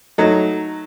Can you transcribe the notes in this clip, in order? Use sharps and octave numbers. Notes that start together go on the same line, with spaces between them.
F#3 A3 D#4